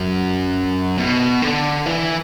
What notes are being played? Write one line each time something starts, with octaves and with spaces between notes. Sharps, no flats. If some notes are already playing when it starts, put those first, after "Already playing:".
Already playing: F#2
B2
D3
E3